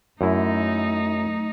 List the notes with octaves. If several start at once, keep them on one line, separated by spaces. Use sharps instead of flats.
F#2 A3 D#4 E4